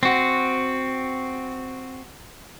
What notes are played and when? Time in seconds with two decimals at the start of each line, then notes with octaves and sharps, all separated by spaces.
0.03 C4 F#4